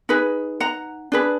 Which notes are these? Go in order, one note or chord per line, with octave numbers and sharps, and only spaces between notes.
D#4 G#4 B4
F#5 A#5
D4 G#4 B4